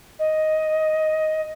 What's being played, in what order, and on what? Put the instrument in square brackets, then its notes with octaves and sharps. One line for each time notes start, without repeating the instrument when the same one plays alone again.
[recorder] D#5